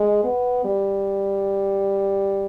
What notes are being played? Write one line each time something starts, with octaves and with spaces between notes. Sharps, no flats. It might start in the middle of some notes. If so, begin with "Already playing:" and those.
Already playing: G#3
B3
G3